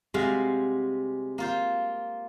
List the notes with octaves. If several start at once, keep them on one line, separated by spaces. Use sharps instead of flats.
C3 G3 G#3 F#4 F5
A#3 F4 C5